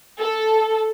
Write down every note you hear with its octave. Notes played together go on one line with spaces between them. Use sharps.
A4